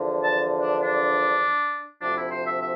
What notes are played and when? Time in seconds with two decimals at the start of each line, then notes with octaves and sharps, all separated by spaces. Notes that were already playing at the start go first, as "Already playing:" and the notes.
Already playing: E2 D3 F3
0.23 A5
0.61 D4
0.81 D4
2.00 D2 C3 F3 D4
2.15 E4
2.30 C5
2.46 E5
2.60 E5